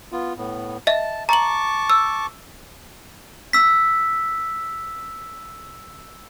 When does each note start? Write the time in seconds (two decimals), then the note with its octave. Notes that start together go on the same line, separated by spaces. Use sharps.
0.12 B3 F4
0.38 A2 B3
0.87 D#5 E5 A5
1.29 A5 A#5 C#6 D6 F#7
1.90 E6
3.53 E6 B6